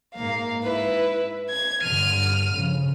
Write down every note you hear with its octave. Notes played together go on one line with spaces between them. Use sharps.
G#2 A#3 F5
E4 B4
G#6
G2 D3 F6 D#7
C#3 F3